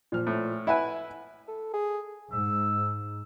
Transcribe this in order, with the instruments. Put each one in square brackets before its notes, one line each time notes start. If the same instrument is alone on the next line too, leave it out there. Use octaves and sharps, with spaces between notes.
[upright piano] A#2 F3 F6
[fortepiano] A2
[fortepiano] E4 B4 [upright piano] E5 F#5 G#5
[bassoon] A4
G#4
[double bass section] G#2 [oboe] E6